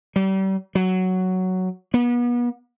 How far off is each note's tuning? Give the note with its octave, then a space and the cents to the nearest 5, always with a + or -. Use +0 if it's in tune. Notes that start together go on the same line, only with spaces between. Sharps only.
G3 -35
F#3 +5
B3 -35